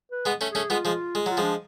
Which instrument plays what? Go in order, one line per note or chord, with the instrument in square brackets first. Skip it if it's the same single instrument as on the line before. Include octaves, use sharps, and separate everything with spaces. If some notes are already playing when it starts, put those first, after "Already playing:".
[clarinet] B4
[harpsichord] G#3 B3
A3 C#4
[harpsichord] A3 C#4 [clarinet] G#4
[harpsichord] G#3 B3 [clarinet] F4
[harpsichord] F3 G#3
G#3
[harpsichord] F#3 [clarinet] F4
[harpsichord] F3 G#3 [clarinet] D4